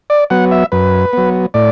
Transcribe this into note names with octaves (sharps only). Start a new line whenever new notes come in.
D5
F#3 B3 F#5
E5
F#2 B4
F#3 B3
A2 D5